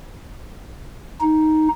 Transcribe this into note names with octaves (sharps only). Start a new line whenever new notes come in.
D#4